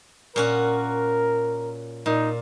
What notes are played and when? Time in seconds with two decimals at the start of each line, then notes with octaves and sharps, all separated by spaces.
0.36 A#2 C#4 F#4 A#4
2.06 A#2 D#4